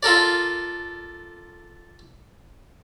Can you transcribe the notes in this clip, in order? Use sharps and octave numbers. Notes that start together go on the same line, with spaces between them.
F4 A4 A#4 D5